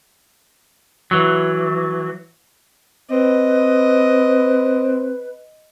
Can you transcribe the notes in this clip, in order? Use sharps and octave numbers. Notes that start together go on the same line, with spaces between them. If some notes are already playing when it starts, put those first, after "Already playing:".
E3 F#3
C4 B4 D#5